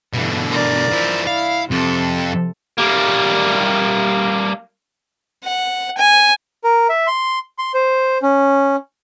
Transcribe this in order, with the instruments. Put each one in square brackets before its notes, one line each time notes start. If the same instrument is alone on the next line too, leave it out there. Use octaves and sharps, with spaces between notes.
[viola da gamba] G2 E3 [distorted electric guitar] B2 D3
[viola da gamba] A#4 D5
[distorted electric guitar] F3 E4
[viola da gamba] E4 [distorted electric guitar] F5
[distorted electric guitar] F2 [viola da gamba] C3 A4
[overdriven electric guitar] G3 A#3
[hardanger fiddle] F#5
G#5
[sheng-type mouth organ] A#4
E5
C6
C6
C5
C#4